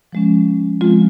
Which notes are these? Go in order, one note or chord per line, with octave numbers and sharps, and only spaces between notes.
F3 G#3 C#4
F3 G#3 C4 F4